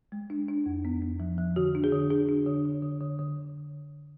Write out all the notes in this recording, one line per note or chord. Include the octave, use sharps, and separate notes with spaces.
G#3
D4
D4
F2
B3
B3
F3
F3
D3 F#4
D4
G#4
D3
D4 G#4
D4
D3
D3
D3
D3
D3